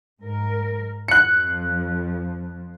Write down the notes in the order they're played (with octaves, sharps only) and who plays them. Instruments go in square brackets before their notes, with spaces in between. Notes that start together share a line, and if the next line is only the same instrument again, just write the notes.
[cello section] G#2 A#4
[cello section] F2 F3 [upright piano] F#6 C#7